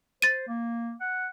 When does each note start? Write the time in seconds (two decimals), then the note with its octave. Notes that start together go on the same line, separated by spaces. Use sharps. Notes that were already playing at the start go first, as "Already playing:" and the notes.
0.22 C5 A6 D#7
0.48 A#3
1.01 F#5